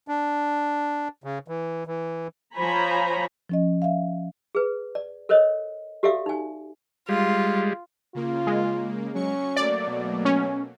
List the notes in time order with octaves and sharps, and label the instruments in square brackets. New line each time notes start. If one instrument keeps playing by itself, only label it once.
[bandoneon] D4
C#3
E3
E3
[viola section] F3 C5 C#5 G#5 A#5 B5
[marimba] F3 C#4 D#5
E5 F5
[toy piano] G#4 B4
D5
A4 A#4 C5 C#5 D#5
F#4 G4 A4 D5 E5 F5
D#4 G#5
[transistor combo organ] G3 G#3 [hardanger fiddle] F4
[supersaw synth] C#3 A#3 [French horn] F4
[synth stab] G#3
[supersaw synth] F#3 C#6 C#7 [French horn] C#4
[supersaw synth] F#3 A3 A#3 [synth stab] D5
[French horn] B2
[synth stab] C#4